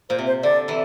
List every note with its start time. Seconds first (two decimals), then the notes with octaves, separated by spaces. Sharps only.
0.09 A#2 C5
0.19 C3
0.27 C5
0.43 D3 D5
0.68 C3 E3